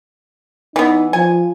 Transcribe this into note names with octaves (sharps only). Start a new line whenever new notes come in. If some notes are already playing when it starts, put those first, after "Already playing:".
E3 B3 D#4
F3 G#5